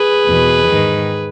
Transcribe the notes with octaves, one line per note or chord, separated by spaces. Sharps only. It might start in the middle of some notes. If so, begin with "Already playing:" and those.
Already playing: G#4 B4
E2 B2
G#2 D#3